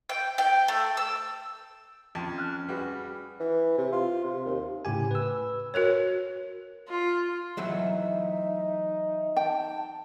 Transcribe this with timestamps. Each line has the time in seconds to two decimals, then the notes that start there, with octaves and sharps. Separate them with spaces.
0.09 G5
0.38 G5
0.68 A3
0.97 E6
2.15 F2 C#4 A5 C6
2.38 F6 F#6
2.69 G3 F#4 G#4 B4
3.40 E3
3.78 C3
3.92 F4
4.24 C3
4.46 D#2
4.85 A2 C#3 G4 G#5
5.11 B4 E6
5.74 F#4 A#4 B4 C#5
6.89 F4
7.57 E3 F#3 A3 D#4 E5
9.36 G5 A5